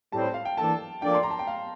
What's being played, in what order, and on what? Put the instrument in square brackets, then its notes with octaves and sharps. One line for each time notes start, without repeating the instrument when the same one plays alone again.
[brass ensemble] A2 G3 C4 [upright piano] A5
[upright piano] F5
G5
[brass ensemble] E3 A#3 D4 A4 [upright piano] A5
[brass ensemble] F3 A#3 D4 A4 D5 [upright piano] G5
[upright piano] C6
A#5
A5
G5
F5